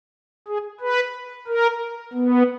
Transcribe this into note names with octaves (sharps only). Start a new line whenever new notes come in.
G#4
B4
A#4
B3